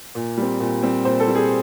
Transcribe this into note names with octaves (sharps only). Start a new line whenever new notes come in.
A#2
G3 C4
A#2
G3 C4
A#2 C5
A4
G3 C4
G#4